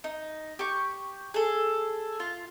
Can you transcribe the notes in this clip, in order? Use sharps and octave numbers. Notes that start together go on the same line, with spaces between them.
D#4
G4 C#6
G#4 A4
F4